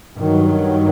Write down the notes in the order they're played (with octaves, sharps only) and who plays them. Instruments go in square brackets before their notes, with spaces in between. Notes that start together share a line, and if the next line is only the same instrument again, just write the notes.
[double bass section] G2 D#3 F#3